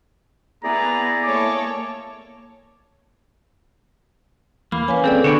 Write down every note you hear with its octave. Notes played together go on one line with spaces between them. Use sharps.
B3 E4 G#4 D5 A#5
A#3 A4 C#5 D6
E2 A#3 B5
C#4 B4 F5 G#5
C4 G#4 A4 D5
D3 B3 D4 F#4 C#5